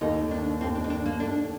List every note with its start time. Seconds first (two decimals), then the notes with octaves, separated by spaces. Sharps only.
0.01 D#2 D#3 A3 D#4
0.31 D4
0.61 D#2 D#3 A3 C4
0.75 D4
0.84 D#4
0.90 D4
1.06 A#3
1.20 D#2 D#3 A3 D4